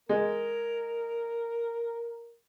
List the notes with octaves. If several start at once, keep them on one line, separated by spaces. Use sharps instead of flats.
G#3 A#4